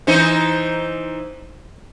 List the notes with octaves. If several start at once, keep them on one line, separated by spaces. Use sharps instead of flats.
E3 D#4 C5